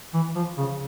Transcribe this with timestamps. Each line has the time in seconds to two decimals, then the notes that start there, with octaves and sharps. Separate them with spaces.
0.14 E3
0.35 F3
0.58 C#3